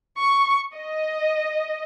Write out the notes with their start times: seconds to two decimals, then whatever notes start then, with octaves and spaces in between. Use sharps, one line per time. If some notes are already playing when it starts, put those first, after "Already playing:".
0.18 C#6
0.74 D#5